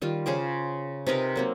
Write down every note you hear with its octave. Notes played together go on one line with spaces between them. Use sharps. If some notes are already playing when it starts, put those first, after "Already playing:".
D#3 G3 F4
C#3 G#4 C5 D6
C3 D#4 A#4 B4
F#3 A#3 C4